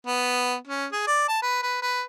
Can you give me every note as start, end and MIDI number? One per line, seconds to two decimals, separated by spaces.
0.07 0.55 59
0.67 0.86 61
0.92 1.05 68
1.07 1.28 74
1.28 1.41 81
1.42 1.60 71
1.63 1.78 71
1.82 2.02 71